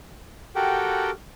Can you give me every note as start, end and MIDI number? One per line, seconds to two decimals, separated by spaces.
0.56 1.10 66
0.56 1.10 67
0.56 1.10 69
0.56 1.10 70
0.56 1.10 78
0.56 1.10 79